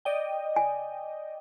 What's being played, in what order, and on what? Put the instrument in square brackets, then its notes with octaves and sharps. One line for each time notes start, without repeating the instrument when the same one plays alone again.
[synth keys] D5 D#5 G5
[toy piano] G#5